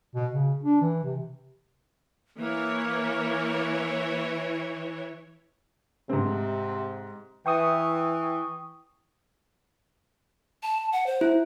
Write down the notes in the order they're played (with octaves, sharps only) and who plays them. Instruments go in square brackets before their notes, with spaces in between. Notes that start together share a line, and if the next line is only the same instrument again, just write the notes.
[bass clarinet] B2
C#3
D4
E3
C3
[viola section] E3 E4 C#5 [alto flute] A#3
[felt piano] G#2 C4 [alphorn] C3
[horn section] E3 [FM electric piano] G5 C#6 D#6
[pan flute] A5
F#5
C5
[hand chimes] E4